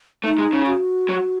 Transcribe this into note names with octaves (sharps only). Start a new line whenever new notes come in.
A3 D#4
G#3
C#3
F#4
F#3